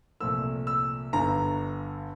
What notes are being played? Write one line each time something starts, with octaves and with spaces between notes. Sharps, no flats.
C2 A#2 F3 A3 E6
E6
G1 G2 D3 A#5